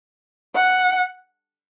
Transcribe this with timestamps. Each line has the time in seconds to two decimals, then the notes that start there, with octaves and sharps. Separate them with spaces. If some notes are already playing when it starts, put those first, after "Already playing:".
0.55 F#5